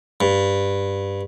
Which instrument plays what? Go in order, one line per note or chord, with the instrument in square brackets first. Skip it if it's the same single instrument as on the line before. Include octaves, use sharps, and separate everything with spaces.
[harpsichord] G2